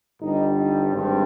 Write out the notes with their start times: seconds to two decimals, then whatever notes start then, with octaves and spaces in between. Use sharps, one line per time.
0.20 G1 G2 G3 D#4
0.56 D#4
0.92 G#1 G2 G3 C4